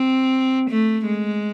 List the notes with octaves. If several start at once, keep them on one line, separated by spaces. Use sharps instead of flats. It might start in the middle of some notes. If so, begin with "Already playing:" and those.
Already playing: C4
A3
G#3